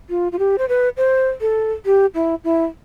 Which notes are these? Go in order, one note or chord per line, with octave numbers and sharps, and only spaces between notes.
F4
F4
G4
C5
B4
C5
A4
G4
E4
E4